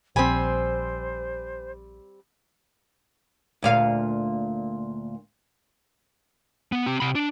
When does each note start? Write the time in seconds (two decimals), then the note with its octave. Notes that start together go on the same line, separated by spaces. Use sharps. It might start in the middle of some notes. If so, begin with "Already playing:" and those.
0.16 A#1 G3 C4 C5 G#5 B5
3.62 D2 A#2 F5
6.72 B3
6.86 C4 G4
7.00 C3 B5
7.15 D4